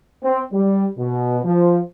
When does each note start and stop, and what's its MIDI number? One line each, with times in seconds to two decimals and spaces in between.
0.23 0.41 60
0.53 0.86 55
0.99 1.39 47
1.44 1.80 53